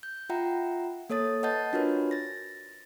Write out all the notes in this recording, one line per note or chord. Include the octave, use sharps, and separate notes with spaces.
G6
F4 E5 F#5 G5 A#5
A#3 A4 C#5 D#6 A6
B4 D#5 F#5 A5 G6 A6
D4 F4 F#4 A#4 B4 C#5
A6 A#6